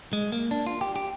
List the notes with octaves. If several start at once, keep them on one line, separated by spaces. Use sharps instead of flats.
G#3
A#3
D4
F4
G4
G4